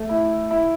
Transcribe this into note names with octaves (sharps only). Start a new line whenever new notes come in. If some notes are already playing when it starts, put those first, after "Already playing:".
Already playing: A3
E4
E4